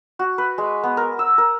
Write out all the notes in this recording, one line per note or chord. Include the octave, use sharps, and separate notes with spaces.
F#4
B4
G#3
B3
A#4
E6
A#4